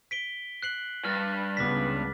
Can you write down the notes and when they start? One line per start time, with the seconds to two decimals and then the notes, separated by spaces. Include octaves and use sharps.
0.11 B6 D7 G7
0.63 F#6 C7 F#7
1.05 G2 F6 A6 A#6
1.57 C#2 C#3 B3 D6 A#6 B6